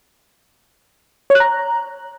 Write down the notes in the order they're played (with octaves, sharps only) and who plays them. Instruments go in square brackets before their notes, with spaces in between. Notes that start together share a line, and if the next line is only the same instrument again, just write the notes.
[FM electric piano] C#5
F#6
A#5